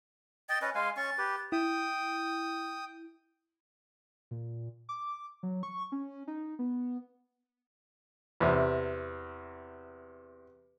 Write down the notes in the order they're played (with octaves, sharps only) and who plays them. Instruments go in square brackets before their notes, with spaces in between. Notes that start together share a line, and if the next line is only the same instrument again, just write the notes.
[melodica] D#5 G5 [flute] A6
[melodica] C#4 B4 [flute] D#5
[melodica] G#3 F5 G#5 [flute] C6
[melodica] C#4 C#6 [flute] A6
[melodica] G4 B4
[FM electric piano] E4 [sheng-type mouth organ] G5 D#6
[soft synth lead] A#2
D6
F#3
C#6
C#4
D#4
B3
[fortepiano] E2 C3